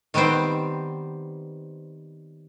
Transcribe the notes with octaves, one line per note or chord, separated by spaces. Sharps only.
D#3 G3 B3 C4 C5